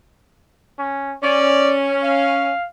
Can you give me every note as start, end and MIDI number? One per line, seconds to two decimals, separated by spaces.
0.78 1.14 61
1.23 2.52 61
1.23 1.75 74
2.03 2.66 77